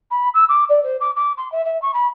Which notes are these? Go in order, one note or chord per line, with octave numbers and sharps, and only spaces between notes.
B5
E6
D6
D5
C5
D6
D6
C6
E5
E5
C#6
B5